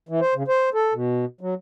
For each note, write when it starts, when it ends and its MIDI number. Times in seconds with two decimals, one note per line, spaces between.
0.09 0.20 52
0.21 0.34 72
0.35 0.43 49
0.48 0.69 72
0.74 0.93 69
0.93 1.25 47
1.41 1.54 54